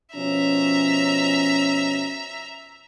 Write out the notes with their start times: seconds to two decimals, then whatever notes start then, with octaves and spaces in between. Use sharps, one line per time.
0.15 B2 F3 C#4 E5 A#5